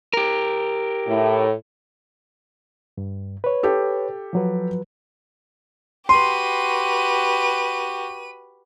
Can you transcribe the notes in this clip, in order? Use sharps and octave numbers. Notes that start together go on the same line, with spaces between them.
G4 A#4
A2
G2
B4 C#5
G4 A4
F3 F#3 B4
F#4 G4 B4 C6 D#7